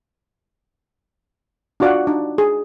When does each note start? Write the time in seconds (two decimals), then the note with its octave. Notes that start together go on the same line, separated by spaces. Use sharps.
1.80 D4 F4 F#4 D5 F5 F#5
2.07 D4 D#4
2.38 G#4